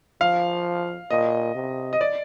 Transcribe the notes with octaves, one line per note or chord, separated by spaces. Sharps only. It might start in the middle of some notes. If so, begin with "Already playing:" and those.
F3 F5
A#2 D#5
C3
D#5
D5